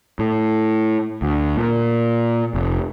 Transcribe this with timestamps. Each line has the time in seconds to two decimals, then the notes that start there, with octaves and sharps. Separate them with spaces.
0.19 A2
1.22 D2
1.57 A#2
2.55 F1